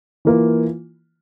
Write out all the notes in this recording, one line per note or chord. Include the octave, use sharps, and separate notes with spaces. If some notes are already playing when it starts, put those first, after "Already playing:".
E3 A#3 F4